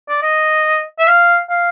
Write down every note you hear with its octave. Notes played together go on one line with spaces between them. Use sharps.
D5
D#5
E5
F5
F5